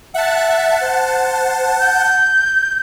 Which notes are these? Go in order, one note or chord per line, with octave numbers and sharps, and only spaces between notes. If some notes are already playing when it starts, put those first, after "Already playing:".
E5 F#5 A5
C5
G6